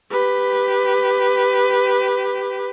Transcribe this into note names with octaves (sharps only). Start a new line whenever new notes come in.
G4 B4